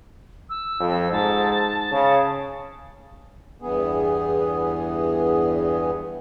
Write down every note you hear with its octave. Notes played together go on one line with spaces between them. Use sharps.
E6
F2
G#2 A5
C#3
E2 G2 E3 B3 G#4